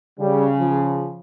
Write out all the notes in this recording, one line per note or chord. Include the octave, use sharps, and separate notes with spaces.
C#3 G3
F3